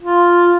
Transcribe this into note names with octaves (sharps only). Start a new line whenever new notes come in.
F4